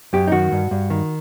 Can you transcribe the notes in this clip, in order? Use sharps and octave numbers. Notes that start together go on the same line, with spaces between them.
F#2 G4
D#4
D#3 F#4
G2
G2
D#3